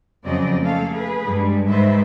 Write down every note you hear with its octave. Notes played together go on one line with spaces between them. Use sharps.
F2 C#3 F#3 C4 D5 D#5
A3 A#3 A4 F5
G#4 B4
G2 G3 G#3
G#2 D#3 B4 C5 E5